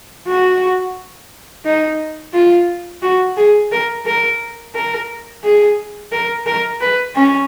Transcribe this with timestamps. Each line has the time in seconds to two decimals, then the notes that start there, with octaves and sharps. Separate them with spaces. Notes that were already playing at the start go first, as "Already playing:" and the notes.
0.28 F#4
1.65 D#4
2.34 F4
3.02 F#4
3.37 G#4
3.72 A#4
4.06 A#4
4.75 A#4
5.44 G#4
6.12 A#4
6.47 A#4
6.81 B4
7.15 C#4